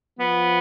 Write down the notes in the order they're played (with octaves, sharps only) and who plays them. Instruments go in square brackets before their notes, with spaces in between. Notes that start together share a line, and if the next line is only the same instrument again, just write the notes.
[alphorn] F3 [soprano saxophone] B3